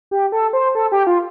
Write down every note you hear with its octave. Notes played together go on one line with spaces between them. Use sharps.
G4
A4
C5
A4
G4
F4